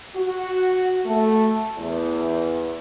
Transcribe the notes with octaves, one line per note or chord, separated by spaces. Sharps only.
F#4
A3
E2